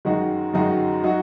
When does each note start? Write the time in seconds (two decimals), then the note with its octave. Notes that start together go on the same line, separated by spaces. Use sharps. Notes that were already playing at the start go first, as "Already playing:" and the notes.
0.05 F#2 D#3 G#3 D#4 F#4
0.53 F#2 D#3 G#3 D#4 F#4
1.04 F#3 D#4 F#4